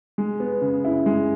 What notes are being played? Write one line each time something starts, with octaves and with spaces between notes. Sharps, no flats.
G#3
B3
C#3
E4
G#3